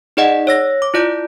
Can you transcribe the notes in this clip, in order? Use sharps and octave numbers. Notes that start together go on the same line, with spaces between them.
D#4 G#4 D5 D#5 F#5
C#5 E6 A#6
D6
E4 F4 D5 G6 D7